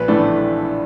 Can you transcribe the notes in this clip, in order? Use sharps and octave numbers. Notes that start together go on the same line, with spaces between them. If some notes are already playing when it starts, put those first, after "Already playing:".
Already playing: A#1 B4
A2 E3 A3 D4